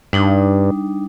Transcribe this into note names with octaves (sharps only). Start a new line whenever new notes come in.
G2 G3 D4 D#4